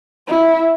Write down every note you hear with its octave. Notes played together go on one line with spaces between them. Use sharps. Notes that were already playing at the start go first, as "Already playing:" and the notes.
E4